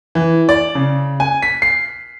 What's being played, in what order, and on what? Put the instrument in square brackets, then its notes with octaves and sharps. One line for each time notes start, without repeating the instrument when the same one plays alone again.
[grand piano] E3
D5
C#3
G#5
B6
C7